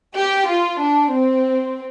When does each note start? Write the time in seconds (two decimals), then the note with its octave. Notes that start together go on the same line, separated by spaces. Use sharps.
0.15 G4
0.48 F4
0.81 D4
1.12 C4